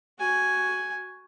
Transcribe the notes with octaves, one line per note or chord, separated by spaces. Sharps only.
F#4 G#5